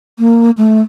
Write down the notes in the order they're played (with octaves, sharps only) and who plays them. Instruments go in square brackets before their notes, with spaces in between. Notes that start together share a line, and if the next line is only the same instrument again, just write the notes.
[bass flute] A#3
A3